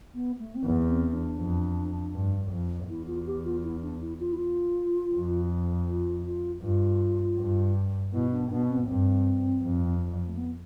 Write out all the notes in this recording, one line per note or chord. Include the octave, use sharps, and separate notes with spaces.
B3
A3
C4
E2 B3
B3
C4
C4
D4
F2
G2
F2
E2 E4
F4
G4
F4
E4
D4
E4
F4
E4
F4
F2
F4
F4
G2 F4
G2
B2 E4
D4
B2 D4
C4
B3
G2 C4
F2
A3
B3